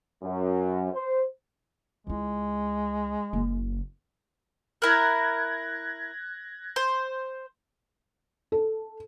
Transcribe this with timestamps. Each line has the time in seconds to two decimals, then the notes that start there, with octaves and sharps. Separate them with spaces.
0.23 F#2
0.92 C5
2.07 C#2 G#3 E4
3.33 F#1 A#3
4.82 E4 A#4 F#6 G#6 A#6
6.76 C5
8.52 A4